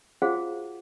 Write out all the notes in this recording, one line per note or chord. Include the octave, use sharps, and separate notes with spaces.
F4 F#4 G#4 C5 F5 F#5